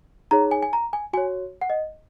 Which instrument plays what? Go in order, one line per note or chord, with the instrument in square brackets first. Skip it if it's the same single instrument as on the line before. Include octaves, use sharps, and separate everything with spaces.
[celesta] D#4 G#4 C#5 A#5
G#5
G#5
A#5
G#5
F#4 G#5
C#5
F#5
D#5